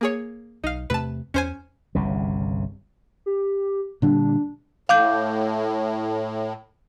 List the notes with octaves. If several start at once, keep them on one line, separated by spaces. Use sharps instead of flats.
A#3 G#4 C#5
B1 D#4 F5
E2 C3 A3 B4 A5
E2 C#4 C5 G#5
G1 C2 C#3
G4
A#2 D3 G3 D4
A2 F5 D6 G6